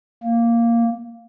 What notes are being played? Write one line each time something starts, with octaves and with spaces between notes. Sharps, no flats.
A#3